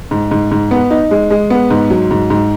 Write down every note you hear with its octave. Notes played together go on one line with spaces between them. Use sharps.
G#2
G#2
G#2
B3
D#4
G#3
G#3
B3
G#2
F#3
G#2
G#2